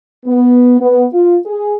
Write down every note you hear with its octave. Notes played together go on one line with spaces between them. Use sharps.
B3
B3
F4
G#4